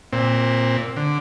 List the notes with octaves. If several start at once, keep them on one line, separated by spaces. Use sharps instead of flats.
A#2 C4
D3